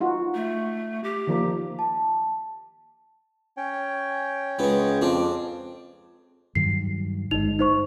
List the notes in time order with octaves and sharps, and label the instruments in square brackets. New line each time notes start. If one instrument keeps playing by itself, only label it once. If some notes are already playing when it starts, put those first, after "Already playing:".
[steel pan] D#4 F4 F#4
[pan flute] A3
G4
[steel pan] D#3 F3 A#3
[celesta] A5
[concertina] C#4 C#5 G5
[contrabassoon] C#2 [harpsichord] G#3 B3
[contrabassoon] F2 [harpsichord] C4 D4
[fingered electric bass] G2 D#3 F#3 [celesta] C7
[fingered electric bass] G1 A#2 G#3 [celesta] D#4 F7
[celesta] D#4 C5 C#6